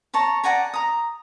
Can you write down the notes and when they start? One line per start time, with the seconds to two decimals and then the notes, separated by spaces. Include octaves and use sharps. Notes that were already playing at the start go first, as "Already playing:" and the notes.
0.14 C#5 A5 A#5
0.44 D5 F#5 G#5 A#5
0.74 A#5 D#6